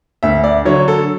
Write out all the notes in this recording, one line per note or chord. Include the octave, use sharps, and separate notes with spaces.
D2 E5
D5
D3 F#3 C#5
A4